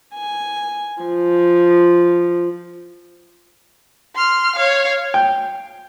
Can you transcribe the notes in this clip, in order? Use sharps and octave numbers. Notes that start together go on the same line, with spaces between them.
G#5
F3
C6 F6
C#5 F5
G5